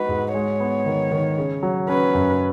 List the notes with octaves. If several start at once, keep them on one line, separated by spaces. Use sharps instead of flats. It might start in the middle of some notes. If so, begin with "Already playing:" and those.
Already playing: G#3 D#4 F#4 B4
G#2
G#3 C#5
B3
D#3
D#3
C#3
F#3
C#4 B4
F#2